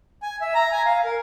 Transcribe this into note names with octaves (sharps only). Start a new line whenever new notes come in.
G#5
E5
A#5
G#5
F5
A#4